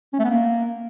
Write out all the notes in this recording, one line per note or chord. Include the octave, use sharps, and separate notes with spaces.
C#4
A3
B3
A#3